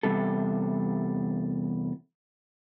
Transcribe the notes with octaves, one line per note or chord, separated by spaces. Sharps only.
E2 C3 G3 A4